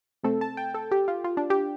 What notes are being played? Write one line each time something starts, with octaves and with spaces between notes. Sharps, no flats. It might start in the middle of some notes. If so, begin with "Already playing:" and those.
C3 A3 C4 A4
A5
G5
A4
G4
F4
F4
D4
G4